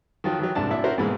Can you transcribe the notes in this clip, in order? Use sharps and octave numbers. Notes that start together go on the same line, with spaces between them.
D#3 F3 F#3
D#3 E3 F#3
C2 G#2 D4 A5
G#1 A#2 D4 E4 E5 A5
C#4 E4 F#4 A#4 C5
G#2 B2 E3 G#3 A#3 B5